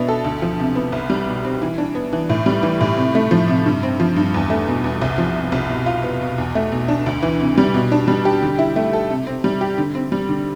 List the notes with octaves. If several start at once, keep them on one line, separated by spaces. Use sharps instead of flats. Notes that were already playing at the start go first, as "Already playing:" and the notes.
Already playing: B2 B3 D4 E4
A4
D2
F3
C3
B3
C2
G3
B2
C4
E3
D4
B3
E3
A2
G3
E3
A2
C3
A3
F3
C3
G2
C4
F3
G2
E2
A3
B2
E2
C2
F3
C3
C2
B2
F4
B3
B2
E2
A3
B2
D4
D2
E3
C3
G3
B2
D4
G3
G4
D3
E4
A3
A4
C3
C4
G3
G4
D3
C4
G3
D3